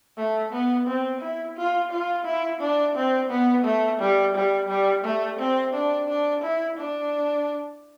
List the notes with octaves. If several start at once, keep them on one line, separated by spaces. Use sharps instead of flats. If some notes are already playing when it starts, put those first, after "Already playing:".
A3
B3
C4
E4
F4
F4
E4
D4
C4
B3
A3
G3
G3
G3
A3
C4
D4
D4
E4
D4